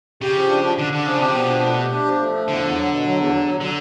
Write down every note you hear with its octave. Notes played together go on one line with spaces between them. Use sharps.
C#3 G4
F3
D4
D4
D3 D4
D3 D4
C#3 F3
C3 G4
B2 F3
D4
A3
G4
D4
F3
A3
F3
E2 D3
E2
F#3
B2
F#3
E2
F#3
F#3
D3 F#3